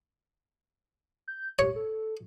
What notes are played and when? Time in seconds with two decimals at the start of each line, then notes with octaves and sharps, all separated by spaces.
1.28 G6
1.59 G4 C#5
1.76 A4